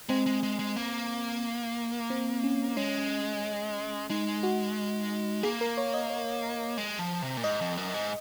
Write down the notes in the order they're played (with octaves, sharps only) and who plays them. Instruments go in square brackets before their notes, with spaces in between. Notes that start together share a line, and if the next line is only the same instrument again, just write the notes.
[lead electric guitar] G#3 [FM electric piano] C4
[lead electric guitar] G#3
G#3
G#3
A#3
[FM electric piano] C4
C#4
[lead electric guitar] G#3 [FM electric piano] C#4
[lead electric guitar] G#3 [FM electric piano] D#4
[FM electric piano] F#4
[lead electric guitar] A#3 [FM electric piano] G#4
[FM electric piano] A#4
C#5
D#5
C#5
[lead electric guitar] G#3
F3
C3
A#2
[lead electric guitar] G#2 [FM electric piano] D#5
[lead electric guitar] F2
F#2
G#2